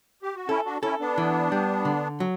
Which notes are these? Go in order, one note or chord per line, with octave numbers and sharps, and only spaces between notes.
G4
F#4
C#4 E4 A4
D4 F#4
C#4 E4 A4
B3 D4
E3
G3
D3
F#3